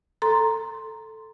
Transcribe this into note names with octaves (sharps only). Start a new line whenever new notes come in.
A4 A#5 C6